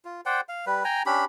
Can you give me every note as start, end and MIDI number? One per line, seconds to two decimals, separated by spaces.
0.05 0.21 65
0.26 0.41 72
0.26 0.41 74
0.26 0.41 78
0.26 0.41 79
0.49 0.65 77
0.66 0.83 55
0.66 0.83 71
0.85 1.03 79
0.85 1.03 80
0.85 1.03 82
1.06 1.25 61
1.06 1.25 62
1.06 1.25 67
1.06 1.25 83